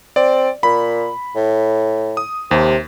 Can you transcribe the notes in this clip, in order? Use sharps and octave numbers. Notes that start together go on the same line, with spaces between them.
C4 D5
A#2 B5
A2
D#6
D#2 C3